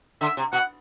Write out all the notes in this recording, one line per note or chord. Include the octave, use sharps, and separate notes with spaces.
D3 E5
C3
B2 F#5